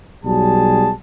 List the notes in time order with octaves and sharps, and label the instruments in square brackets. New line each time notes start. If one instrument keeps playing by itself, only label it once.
[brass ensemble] B1 F#3 G3 G#4 A5